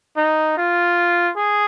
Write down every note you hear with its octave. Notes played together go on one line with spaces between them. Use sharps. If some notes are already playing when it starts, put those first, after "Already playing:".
D#4
F4
G#4